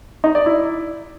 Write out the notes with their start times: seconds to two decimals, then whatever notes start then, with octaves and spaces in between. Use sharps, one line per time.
0.24 D#4
0.35 D5
0.46 E4